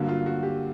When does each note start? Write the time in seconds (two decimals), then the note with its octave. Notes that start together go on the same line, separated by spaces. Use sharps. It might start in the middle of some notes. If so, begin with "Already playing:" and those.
Already playing: G2 D3 F#3 A#3
0.09 F4
0.26 F#4
0.43 G4